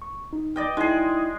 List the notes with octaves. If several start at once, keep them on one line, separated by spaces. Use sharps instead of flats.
C#6
D#4
D5 D#5 G5
G#3 D#4 E4 G#4 G5